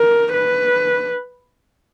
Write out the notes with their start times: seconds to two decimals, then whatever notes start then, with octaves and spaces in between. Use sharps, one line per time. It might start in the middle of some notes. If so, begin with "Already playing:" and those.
Already playing: A#4
0.34 B4